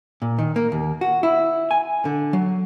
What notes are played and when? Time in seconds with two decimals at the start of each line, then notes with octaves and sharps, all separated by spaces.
0.22 A#2
0.39 D#3
0.56 A#3
0.72 D#2
1.01 F#4
1.23 E4
1.71 G#5
2.05 D3
2.33 F#3